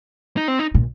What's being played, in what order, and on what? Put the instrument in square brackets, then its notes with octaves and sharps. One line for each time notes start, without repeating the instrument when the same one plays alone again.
[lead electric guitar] D#4
C4
D#4
[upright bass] A#2